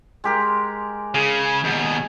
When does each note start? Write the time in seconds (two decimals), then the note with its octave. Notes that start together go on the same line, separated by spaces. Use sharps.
0.24 G#3 G4 A#4
1.14 C#3 G#4
1.64 D#2 B2